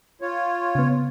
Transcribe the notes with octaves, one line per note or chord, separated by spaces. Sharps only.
F4 C#5
C#3 B3